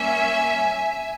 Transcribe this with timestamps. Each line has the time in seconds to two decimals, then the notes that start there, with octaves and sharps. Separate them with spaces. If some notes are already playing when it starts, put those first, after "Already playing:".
Already playing: G3 A#3 C#4 E5 G#5